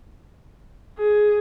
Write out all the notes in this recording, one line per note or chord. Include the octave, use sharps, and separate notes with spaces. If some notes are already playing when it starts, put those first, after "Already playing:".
G#4